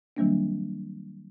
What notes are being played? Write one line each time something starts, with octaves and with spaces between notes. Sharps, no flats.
D#3 F#3 G3 A#3 C4 D4